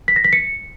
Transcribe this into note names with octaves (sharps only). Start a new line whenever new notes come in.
B6
A#6
B6
C#7